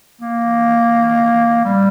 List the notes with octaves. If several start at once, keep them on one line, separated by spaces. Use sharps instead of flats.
A#3
G3